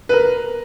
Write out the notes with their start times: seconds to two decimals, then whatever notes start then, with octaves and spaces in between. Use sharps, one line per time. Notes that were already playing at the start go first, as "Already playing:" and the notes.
0.09 B4
0.13 A#4